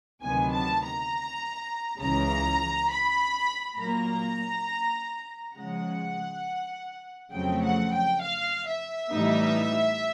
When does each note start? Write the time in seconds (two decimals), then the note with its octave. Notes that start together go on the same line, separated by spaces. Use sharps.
0.23 D2 C3 D#3 F#3 B3 G#5
0.52 A5
0.83 A#5
2.00 C#2 C#3 E3 A#5
2.90 B5
3.78 A#2 F#3 A#3 A#5
5.56 C#3 F3 G#3 F#5
7.33 F2 C#3 F#3 A3 C4 G5
7.64 F#5
7.93 G5
8.22 F5
8.67 E5
9.12 A2 E3 G3 B3 D#4